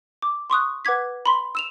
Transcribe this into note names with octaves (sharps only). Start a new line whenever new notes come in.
D6
C6 C#6 D#6 F#6
B4 F#5 D6 G#6 B6
B5 C6 B6
E6 E7 F7